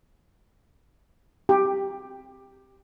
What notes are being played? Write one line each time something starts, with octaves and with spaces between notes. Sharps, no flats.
G4